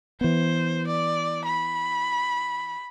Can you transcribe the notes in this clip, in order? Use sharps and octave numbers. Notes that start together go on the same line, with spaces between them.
E3 B3 C5
D5
B5